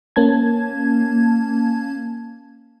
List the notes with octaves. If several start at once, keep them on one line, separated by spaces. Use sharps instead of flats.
A#3 C#4 A5 G#6